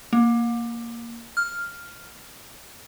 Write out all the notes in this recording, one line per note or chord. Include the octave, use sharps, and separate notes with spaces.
A#3
F6